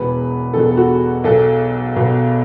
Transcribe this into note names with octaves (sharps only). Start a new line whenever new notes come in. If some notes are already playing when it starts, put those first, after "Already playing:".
Already playing: E1 E2 B2 B4
E1 E2 B2 A4
A4
F#4
B1 B2 A4
B1 B2